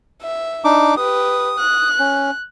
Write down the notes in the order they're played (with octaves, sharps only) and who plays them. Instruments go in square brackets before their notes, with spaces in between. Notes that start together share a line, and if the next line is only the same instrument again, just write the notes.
[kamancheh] E5
[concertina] D4 D#4 D6
[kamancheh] G4 B4 [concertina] D#6
[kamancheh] F#6
[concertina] C#4